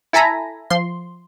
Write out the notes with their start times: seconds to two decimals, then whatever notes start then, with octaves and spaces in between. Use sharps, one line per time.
0.13 E4 A4 G#5 A#5 B5
0.70 F3 C6